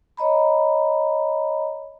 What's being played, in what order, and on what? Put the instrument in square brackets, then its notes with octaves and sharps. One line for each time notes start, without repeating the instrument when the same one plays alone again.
[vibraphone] C#5 D#5 A#5 B5